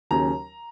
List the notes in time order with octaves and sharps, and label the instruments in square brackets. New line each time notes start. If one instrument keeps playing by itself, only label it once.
[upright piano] D#2 C#3 F#3 C#4 A#5